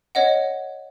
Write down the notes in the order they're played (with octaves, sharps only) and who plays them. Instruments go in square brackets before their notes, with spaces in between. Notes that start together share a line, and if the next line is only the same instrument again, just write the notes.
[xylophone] C#5 D#5 F#5